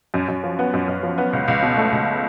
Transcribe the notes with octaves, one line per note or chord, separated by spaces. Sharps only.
F#2
F#2
F3
B3
F#2
F#2
F3
B3
C#2
C#2
B2
A3
C#2